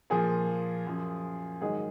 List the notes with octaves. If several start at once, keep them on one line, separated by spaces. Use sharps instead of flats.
A#2 F3 G#4
F#2 F3
G#2 D#3 F#3 G#4